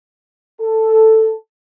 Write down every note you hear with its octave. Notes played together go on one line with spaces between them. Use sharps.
A4